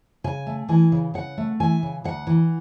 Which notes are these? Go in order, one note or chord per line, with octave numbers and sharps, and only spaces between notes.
C#3 G#5
A3
E3 G#5
C#3
C#3 F#5
A3
E3 G#5
C#3
D2 F#5
E3